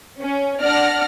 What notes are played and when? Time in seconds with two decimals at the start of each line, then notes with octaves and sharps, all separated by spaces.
0.21 C#4
0.62 D4 D5 F#5 F6 A#6